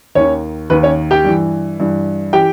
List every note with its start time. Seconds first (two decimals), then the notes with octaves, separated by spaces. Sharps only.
0.15 D#2 D#3 C#4 C#5
0.70 D#2 D#3 B4
0.83 C#4 C#5
1.11 G4 G5
1.25 G2 E3
1.80 G2 E3
2.33 E3 G4 G5